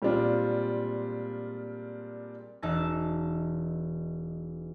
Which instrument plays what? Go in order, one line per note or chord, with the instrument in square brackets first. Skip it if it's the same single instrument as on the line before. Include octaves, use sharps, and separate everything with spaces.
[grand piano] A#2 G3 G#3 C4 D4 F4
[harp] E1 D#4 E5 A5